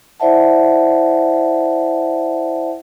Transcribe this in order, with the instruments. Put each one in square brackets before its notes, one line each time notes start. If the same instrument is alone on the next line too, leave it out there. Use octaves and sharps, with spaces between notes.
[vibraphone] E4 C5 D5 E5 F#5 A5